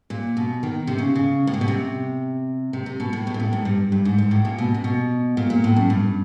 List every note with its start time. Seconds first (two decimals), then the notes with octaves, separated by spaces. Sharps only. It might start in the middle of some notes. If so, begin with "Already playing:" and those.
0.10 A#2
0.37 B2
0.63 D#3
0.87 C3
0.99 C#3
1.16 C#3
1.47 A2
1.54 A#2
1.61 B2
1.68 C3
2.73 C3
2.86 C3
3.00 B2
3.13 A2
3.27 B2
3.34 A#2
3.40 A2
3.53 G#2
3.65 G2
3.92 G2
4.05 G#2
4.18 G#2
4.31 A2
4.45 A#2
4.58 B2
4.74 C3
4.84 B2
5.37 A#2
5.50 A#2
5.64 A2
5.76 F#2
5.90 G2